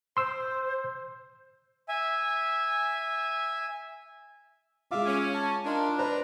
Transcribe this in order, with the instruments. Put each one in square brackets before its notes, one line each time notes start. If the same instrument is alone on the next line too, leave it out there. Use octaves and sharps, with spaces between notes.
[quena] C5 [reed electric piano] C6 E6
[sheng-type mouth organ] E5 G#5
[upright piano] G#3 F4 [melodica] E5 F5 D6
[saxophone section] C#4
[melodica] A5
[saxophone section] D4 [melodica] D#4 F4 A#4
[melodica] B4 A#5 [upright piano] C5 D5 B5